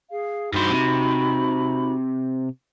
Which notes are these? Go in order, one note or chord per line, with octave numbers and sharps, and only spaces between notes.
G#4 F5
G2 D#4 F#4 C5 B5
C3